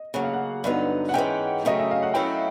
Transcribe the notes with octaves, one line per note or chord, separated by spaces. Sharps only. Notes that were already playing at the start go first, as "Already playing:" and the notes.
Already playing: D#5
C#3 F#3 A#3 F#5
F5
F#5
G2 D3 F#3 B3 D#4
F#5
G#2 E3 G#3 C#4 G5
F#2 C#3 F#3 A3 C#4 D#5
E5
F5
F#5
F#3 A3 C#4 E4 G5